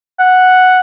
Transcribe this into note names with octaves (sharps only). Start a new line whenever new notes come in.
F#5